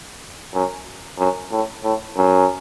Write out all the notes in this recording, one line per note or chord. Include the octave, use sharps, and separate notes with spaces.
F#2
F#2
A2
A2
F#2